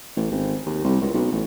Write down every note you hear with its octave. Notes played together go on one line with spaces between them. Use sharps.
A1
G#1
D#2
C2
C#2
B1
A1